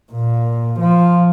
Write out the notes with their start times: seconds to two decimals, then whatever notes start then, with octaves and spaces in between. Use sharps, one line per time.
0.12 A#2
0.80 F3